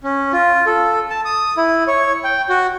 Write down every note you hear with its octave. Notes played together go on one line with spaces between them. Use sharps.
C#4
F4
A4
A5
D#6
E4
C#5
G5
F#4